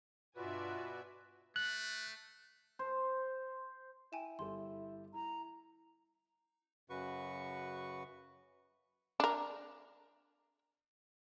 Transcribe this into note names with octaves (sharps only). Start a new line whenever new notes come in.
G2 B2 F4 F#4 B4 D5 E5 G#5
A3 F#6
C5
E4 G5 G#5 E7
G1 G4 A4 C6
E4 A#5
F#2 C#3 F#4 B4 C#6
D4 A#4